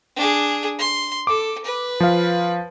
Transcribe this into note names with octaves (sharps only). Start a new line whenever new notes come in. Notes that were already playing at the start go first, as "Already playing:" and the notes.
D4 G#4
C6
A4 D6
B4
F3 F5